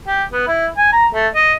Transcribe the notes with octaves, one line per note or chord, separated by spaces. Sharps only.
G4
B3
E4
G#5
A#5
A3
D#5